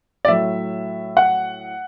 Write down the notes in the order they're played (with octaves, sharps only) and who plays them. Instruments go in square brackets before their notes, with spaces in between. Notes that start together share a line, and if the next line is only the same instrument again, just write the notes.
[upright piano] D5
A2 F#3 E5
F#5